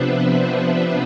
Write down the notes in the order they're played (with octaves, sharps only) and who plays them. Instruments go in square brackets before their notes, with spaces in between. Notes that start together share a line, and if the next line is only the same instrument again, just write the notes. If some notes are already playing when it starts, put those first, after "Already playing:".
Already playing: [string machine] C3 F3 B3 D4 B4 C5 E5